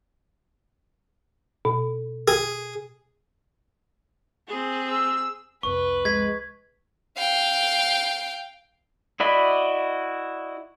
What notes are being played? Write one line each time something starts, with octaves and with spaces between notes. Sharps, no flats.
B2
G#4
C4 G#4
E6
C2 F2 B4 C#6
G#3 G#6 B6
F5 G5
E4 F#4 D5 D#5 B5